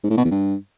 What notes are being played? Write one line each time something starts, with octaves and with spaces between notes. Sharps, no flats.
G#2
A2
B2
E2
G2